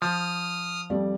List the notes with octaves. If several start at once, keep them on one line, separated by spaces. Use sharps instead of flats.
F3 D#6 F6
F2 G3 D5